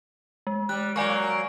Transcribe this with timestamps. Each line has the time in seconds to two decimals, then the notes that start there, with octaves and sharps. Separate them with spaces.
0.47 G#3
0.69 G3 F#6
0.96 F#3 A#3 D5 G#5 C#6